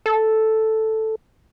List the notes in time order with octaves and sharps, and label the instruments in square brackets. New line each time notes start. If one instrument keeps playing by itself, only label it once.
[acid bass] A4